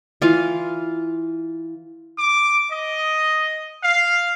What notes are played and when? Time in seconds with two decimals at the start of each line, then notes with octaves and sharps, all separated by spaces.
0.22 E3 F4 F5
2.19 D6
2.72 D#5
3.84 F5